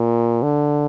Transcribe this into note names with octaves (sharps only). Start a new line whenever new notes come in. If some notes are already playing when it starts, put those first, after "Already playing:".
Already playing: A#2
D3